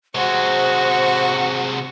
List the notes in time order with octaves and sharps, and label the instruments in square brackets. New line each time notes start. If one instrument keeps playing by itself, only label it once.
[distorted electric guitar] C3 G#3 [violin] F#4 C#6 [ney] C5